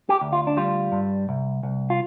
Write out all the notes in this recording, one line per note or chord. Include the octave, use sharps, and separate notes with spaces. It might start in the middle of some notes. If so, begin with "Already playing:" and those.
G4
D2
F4
D4
G3 F4
G2
C2
C2
F4